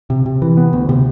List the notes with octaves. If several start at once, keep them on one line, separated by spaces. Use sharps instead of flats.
C3
C3
E3
B3
D2
C3